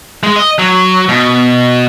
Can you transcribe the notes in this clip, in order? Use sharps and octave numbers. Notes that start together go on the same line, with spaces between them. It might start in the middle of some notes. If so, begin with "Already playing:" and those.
G#3
D#5
F#3
B2